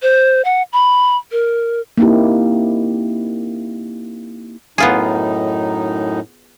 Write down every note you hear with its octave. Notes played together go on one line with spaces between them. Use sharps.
C5
F#5
B5
A#4
A#3 C4 D#4 E4 G4
F#2 A2 B3 D#4 F4 G#4